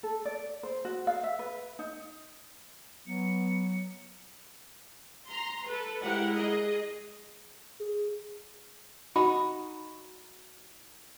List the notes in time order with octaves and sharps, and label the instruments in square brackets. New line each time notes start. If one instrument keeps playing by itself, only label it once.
[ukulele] A4
D5
C5
F#4
F5
E5
B4
D#4
[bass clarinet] F#3 [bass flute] B3 [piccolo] C#7
[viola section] A#5 C6
A4 B4
G#3 E4 G4 A#4 F#5
G#4 D#5
[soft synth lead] G#4
[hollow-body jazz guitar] D#4 F#4 [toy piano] B5